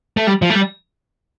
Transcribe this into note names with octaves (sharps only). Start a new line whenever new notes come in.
A3
G3
F3
A3
G3